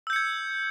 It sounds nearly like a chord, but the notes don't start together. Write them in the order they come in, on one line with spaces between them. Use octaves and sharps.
E6 G6 C#7 G#6